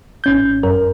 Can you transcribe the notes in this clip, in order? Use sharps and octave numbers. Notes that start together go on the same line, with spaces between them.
G#1 C#4 G6
F#2 A#4